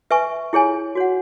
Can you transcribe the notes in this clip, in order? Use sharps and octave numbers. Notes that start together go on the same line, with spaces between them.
B4 E5 G#5 C#6
E4 G#4 C#5 G#5
F#4 C#5 F#5